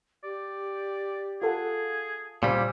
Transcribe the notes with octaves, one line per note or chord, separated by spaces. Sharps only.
G4 D5
F4 G#4 A4 F#5
A#2 C#3 G3 C5 G#5 E6